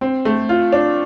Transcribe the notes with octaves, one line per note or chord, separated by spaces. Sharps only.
C4
A3
F4
D4